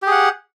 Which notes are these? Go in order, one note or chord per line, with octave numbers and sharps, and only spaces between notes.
G4 G#4 F#5